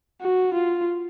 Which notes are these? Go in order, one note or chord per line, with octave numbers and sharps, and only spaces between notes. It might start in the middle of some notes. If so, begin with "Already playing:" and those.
F#4
F4